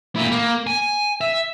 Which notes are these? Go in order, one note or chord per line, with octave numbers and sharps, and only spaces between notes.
A#2 E4
A#3
G#5
E5